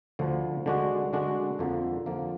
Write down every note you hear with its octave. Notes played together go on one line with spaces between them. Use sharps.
D2 D3 F3
D3 G#3 D4 F#4
D3 G#3 D4 F#4
F2 D3 F3 A#3
F2 D3 F3 A#3